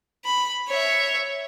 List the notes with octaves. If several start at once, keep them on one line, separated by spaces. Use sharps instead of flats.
B5
C#5 E5